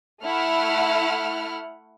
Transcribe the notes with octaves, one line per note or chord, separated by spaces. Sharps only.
A3 E4 F#5 F6